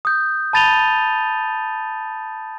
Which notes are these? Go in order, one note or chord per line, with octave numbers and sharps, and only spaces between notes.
D#6 G6
A5 B5 A6 D#7 F7 G7